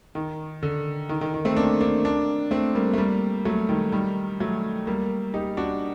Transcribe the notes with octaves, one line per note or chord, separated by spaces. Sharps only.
D#3
D3
D#3
D#3
D#3
A3 C4
A#3 D4
A#3 D4
A#3 D4
A3 C4
G3 A#3
A3
G3 A#3
F#3 A3
D#3 G3
D#3 G3
F#3 A3
G3 A#3
D#4 G4
D4 F#4